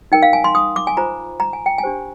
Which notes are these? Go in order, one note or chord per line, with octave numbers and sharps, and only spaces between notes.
D#4 A#4 G5
F5
G#5
C6
D#6
D6
G#5
F4 C5 A#5
A#5
G#5
G5
G#5
D4 G4 C5